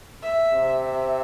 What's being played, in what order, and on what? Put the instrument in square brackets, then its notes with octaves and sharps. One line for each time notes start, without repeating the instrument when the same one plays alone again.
[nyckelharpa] E5
[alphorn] C3
[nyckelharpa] E5